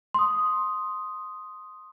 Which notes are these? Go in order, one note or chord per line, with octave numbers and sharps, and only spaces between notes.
C6 D#6